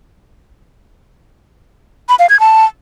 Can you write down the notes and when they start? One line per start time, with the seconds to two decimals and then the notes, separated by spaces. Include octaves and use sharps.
2.09 B5
2.19 F5
2.29 G#6
2.40 A5